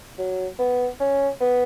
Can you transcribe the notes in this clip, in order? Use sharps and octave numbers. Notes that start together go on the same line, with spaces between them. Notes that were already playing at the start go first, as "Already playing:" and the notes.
F#3
B3
C#4
B3